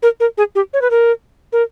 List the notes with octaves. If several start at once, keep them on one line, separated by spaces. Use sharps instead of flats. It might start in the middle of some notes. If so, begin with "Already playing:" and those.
A#4
A#4
G#4
G4
C#5
B4
A#4
A#4